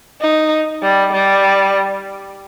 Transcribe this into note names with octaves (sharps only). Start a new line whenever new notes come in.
D#4
G3
G3